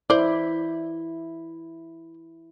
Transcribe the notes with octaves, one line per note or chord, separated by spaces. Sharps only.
E4 C5 D5